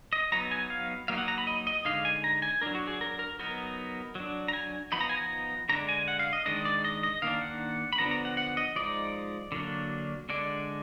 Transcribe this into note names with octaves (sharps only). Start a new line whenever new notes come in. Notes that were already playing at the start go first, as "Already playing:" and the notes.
D#5
F#3 B3 D#4 A#5
G#5
F5
F#3 A#3 D#4 F5
F#5
A#5
B5
D#5
D#5
D3 G#3 D#4 F5
G#5
A#5
G#5
F#3 D4 A#4
F#4
G#4
A#4
A#4
F#3 B3 D#4 A#4
F#3 D4
A#5
G#5
F3 B3 D#4 B5
A#5
G#5
A#5
D3 G#3 D4 A#5
G#5
F#5
F5
D#5
D#3 G#3 D4 D#5
D5
D#5
D#5
D#3 A#3 D4 F5
F#5
B5
D3 F3 B3 D4 A#5
A#5
F#5
F#5
D#5
F3 G#3 D#4 D5
D3 F#3 A#3 D4
D3 G#3 D4 D5